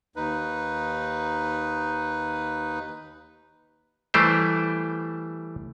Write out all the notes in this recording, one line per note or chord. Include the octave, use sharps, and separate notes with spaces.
D#2 D#4 B4
E3 G3 A3 G4 C5